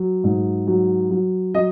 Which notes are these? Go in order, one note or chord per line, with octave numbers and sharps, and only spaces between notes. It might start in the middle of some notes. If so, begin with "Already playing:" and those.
Already playing: F#3
G#2
F#3
F#3
F#3 D#5